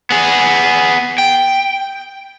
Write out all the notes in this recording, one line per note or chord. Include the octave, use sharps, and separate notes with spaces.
B3 G#4
G5